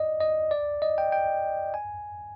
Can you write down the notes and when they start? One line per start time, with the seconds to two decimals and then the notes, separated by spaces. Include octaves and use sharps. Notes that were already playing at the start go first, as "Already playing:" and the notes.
Already playing: D5 D#5
0.21 D#5
0.51 D5
0.82 D#5
0.98 G5
1.12 G5
1.74 G#5